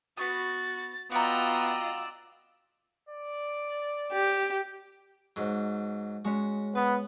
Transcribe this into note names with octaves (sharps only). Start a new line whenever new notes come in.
B3 F#4 C#6 D#6 A6
B3 F4 F#4 D5 D#5 G5 A#5 E6
D5
G4
G#2 F#3
G#3 C#4 F#4
B3 B4